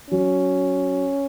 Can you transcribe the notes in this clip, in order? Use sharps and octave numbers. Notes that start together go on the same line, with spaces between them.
F#3 C#4